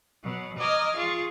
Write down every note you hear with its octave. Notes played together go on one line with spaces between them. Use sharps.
B2 F#3
D#5 A#5 D6 F6 G#6
F4 G#4 C#6 A6